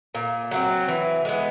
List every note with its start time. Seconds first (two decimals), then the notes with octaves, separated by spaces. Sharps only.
0.15 A#2
0.51 F#3 A3 C4
0.88 E3
1.25 G#3 B3